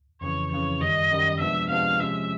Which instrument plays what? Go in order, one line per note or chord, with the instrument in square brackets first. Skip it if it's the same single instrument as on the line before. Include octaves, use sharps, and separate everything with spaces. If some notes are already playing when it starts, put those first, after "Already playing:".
[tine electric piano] F2 C#3 E3 [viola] C#5
[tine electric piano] F2 C#3 E3 [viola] C#5
[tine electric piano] F#2 D#3 G3 [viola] D#5
[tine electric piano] F#2 D#3 G3
[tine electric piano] C3 F3 G#3 B3 D4 [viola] E5
[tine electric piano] C3 F3 G#3 B3 D4 [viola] F5
[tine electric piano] C3 F3 G#3 C#4 [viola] E5